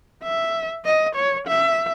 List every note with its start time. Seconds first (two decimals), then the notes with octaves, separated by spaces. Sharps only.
0.23 E5
0.85 D#5
1.16 C#5
1.48 E5